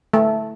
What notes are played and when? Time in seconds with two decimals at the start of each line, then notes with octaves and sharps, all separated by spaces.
0.14 A3